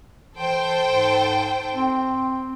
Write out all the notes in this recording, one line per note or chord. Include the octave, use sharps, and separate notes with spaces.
E3 A4 C5 G5
G#2
C4